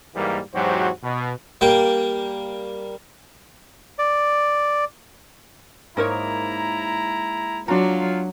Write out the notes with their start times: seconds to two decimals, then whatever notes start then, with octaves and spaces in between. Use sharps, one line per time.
0.15 G#2 E3 G3 A#3
0.54 E2 G#2 F#3 F#4 G4 C5
1.03 B2
1.61 G3 A#3 G5
3.99 D5
5.97 G#2 A#3 D#4 E4 A#4 C#5 A#5
7.68 F#3 D4 F4 F#4 F5 A#5